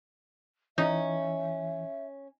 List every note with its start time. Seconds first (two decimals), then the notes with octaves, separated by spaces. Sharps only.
0.78 E3 C#4 D#4 E5